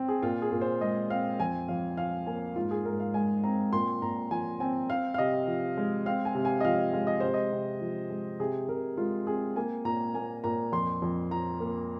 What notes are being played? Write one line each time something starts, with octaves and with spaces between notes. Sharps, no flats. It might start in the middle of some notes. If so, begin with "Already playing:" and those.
Already playing: C4
G#4
A#2 F4
G#4
A#2
C5
G#3 D#5
C4 F5
F2 G#5
F2 F5
F3 F5
A#3 G#5
G#2 F4
G#4
G#2 A#4
F5
G#3 G#5
C4 A#5
A#2 C6
A#2 A#5
F3 G#5
C4 G#5
C4 F5
F5
C3 D#5
F3
G#3
C4 F5
G#5
C3
G#5
D#5
F3 F5
G#3 F5
D#5
C3 C5
D#5
C3
F3
G#3
C3 G#4
C3 A#4
G#3 F4
C4 G#4
A#3 G#5
A#2 A#5
A#3 G#5
A#2 A#5
F2 C6
F2
F3 A#5
A#3